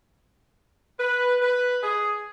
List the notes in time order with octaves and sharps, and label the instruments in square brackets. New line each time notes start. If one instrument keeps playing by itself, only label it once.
[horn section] B4
B4
G#4